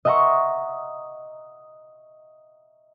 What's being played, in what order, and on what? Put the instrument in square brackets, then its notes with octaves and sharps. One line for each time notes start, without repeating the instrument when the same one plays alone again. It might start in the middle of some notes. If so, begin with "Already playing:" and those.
[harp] D#5 E5 F#5 A#5 C6 C#6